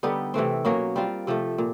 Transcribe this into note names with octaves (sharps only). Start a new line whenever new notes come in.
D3 G3 B3 D#4
C3 E3 A3 C4
B2 F#3 A#3 C#4
G3 C4 F4
C3 F3 A3
A#2